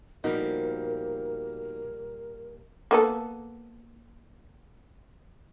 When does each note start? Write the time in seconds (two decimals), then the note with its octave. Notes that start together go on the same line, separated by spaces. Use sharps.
0.24 A#2 F3 G3 B3 D#4 F#4 A#4
2.91 A#3 B3 A4